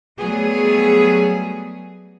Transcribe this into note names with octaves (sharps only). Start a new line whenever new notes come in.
F#3 G3 A3 B3 G#4